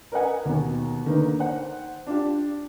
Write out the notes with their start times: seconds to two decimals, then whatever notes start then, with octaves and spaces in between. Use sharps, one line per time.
0.12 A#4 B4 D#5 F#5 G#5
0.45 D#2 B2
1.05 D3 D#3 A#3 B4
1.39 C5 F#5
2.07 D4 F4 G4